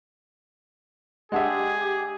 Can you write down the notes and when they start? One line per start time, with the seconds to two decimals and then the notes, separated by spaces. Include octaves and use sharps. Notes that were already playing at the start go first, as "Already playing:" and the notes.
1.32 G#3 D4 G4 G#4 D#5 E5 F#5 A5